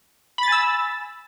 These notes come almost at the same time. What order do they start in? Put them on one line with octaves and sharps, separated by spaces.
B5 A6 G#5 E6